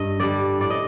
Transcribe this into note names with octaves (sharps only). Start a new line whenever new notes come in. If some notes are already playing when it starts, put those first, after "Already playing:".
Already playing: G2 D#5
D3 G3 D5
A2 D5
D#5